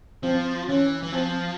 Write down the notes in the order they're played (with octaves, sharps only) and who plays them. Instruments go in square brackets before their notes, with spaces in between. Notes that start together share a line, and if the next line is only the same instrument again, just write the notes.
[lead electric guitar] F3 [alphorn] C4
[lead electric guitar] E3 [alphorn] C#4
[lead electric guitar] E3
[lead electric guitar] F3 [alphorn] C4